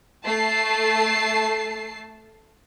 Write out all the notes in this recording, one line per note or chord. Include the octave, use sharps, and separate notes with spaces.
A3 A5 C7